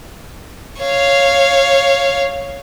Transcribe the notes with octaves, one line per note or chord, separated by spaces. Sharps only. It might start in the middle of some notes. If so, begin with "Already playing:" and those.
C#5 F5